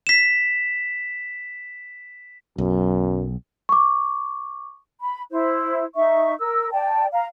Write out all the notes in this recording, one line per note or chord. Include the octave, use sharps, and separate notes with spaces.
B6 E7
B1 F#2
C#6 D6
B5
E4 C5
D#4 E5 C#6
A#4 E6
D5 G5 A5
F5 A#5